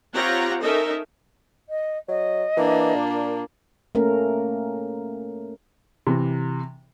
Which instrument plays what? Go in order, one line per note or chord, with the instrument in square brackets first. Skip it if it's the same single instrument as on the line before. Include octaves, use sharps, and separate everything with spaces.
[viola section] C4 F4 G4 C#5 F#5 A#5
C#4 D#4 A4 A#4 D#5 E5
[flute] D#5
[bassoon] F#3 [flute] D#5
[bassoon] E3 [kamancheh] A#3 D4
[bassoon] A#2
[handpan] A3 A#3 C#4 A#4
[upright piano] C3 E3